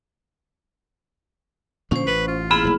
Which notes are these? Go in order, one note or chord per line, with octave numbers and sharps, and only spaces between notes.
A#2 D3 F3 C#4 C5
A1 B4
F4
A#3 E4 G#4 B5 F6 E7
F1 B1